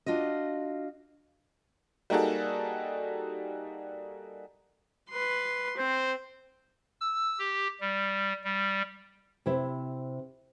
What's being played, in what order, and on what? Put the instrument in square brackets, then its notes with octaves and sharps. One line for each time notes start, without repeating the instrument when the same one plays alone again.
[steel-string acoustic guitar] D4 F4 F#4 D#5
[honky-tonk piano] G3 A#3 D#4 F#4 G#4 A4
[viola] B4 C6
[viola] C4 [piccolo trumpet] C5
[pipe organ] E6
G4
G3
G3
[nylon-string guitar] C3 E4 C5